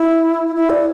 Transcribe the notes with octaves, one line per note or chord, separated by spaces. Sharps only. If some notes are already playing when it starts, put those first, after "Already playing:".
Already playing: E4
E4
D5